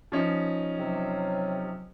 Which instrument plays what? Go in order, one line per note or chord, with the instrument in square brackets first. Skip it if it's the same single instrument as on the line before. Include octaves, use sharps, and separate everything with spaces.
[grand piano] F3 C#4 D#4
[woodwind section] C3 F#3